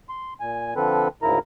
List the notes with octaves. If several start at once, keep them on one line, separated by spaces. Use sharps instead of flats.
C6
A#2 G#5
D3 F3 C4 A4 B4
D2 G#2 C#3 E4 A#4 A#5